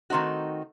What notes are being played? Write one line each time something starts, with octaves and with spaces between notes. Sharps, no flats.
D#3 A3 C4 D#4 F#4